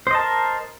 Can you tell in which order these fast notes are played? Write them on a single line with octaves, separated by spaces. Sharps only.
C5 D#5 A5 A#4